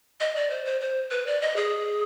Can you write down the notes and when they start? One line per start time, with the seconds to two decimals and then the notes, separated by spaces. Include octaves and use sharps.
0.20 D#5
0.36 D5
0.50 C5
0.65 C5
0.81 C5
1.11 B4
1.27 D5
1.41 D#5
1.56 G#4